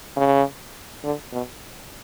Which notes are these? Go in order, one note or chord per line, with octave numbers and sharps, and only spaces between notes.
C#3
D3
B2